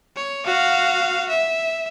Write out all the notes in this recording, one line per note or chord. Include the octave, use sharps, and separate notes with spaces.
C#5
F#4 F5
E5